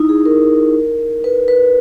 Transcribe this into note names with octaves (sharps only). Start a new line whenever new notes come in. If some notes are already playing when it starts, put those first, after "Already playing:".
Already playing: D#4 E4
G#4
A#4
B4
B4